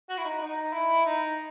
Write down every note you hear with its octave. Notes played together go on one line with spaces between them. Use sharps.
F#4
E4
D#4
D#4
E4
D#4